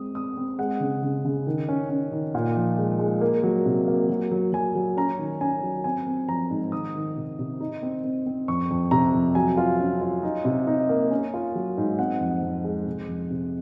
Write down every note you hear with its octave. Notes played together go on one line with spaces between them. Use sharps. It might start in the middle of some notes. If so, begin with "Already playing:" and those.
Already playing: G#3 C4 D#6
C4 D#6
C4
G#3 F#5
C#3
C#3
C#3
D#3
C#4
C#4
D#3
A#2
F3
G#3
G#3
A#3
F#3
C3
A#3
F#3
F#3
F#3 G#5
F#3
C#4 A#5
D#3
C#4 G#5
F#3
C4 G#5
C4
F3 A#5
G#2
D#3 D#6
D#3
C3
C3
D#4
C4
C4
C4
F2 C#6
F2
C3 A#5
F2
F#3 G#5
F4
C#4
F4
D#4
C3
D#4
A#3
C#4
F4
F#3
G#2
C4 F#5
F2
F2
G#3
C3
F2
C3